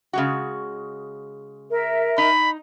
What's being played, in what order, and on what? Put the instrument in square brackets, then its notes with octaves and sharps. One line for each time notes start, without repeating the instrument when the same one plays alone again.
[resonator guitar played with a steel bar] C#3 G#3 F#4
[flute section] A#4 E5
[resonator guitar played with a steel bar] D#4 [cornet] B5